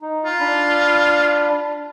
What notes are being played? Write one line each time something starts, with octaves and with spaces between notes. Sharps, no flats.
D#4
F4
D4 B5